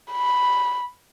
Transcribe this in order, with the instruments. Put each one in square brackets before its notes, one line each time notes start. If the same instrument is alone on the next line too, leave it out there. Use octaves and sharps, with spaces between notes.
[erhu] B5